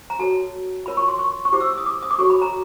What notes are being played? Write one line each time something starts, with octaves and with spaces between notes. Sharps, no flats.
A#5
F#4 A4 C#5 A5
F4 A#4 C#5 B5
C#6
C6
C#6
C#6
E4 G4 C5 D6
E6
D#6
D6
D#6
D6
F#4 A4 C#5 C#6
B5
A#5